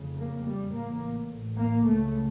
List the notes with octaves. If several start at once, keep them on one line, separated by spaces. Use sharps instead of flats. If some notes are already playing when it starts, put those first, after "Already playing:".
Already playing: F1 F2 C#3
A#3
G3
A1 A2 A#3
A#3
C#2 C#3 A3